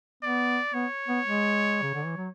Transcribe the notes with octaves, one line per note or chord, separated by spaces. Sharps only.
B3 D5
B3 C#5
B3
G#3
C#3
D3
E3
F#3